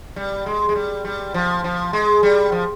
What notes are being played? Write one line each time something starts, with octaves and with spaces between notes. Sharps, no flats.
G3
G#3
G#3
G3
G3
F3
F3
G#3
G3
F3